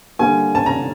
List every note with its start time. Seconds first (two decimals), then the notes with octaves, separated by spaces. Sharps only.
0.19 D3 G3 A#3 G#5
0.55 A5
0.66 A#5